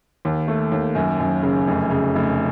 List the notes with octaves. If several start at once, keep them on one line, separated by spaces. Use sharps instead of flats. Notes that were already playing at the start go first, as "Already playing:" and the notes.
D#2
A3
D#2
F#2
F#2
C#3
F1
C#3
F1